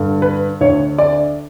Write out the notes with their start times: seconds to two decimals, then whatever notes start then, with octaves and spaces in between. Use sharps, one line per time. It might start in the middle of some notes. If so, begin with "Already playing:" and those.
Already playing: G2 D3
0.22 B4
0.61 D2 D3 C#5
0.99 D5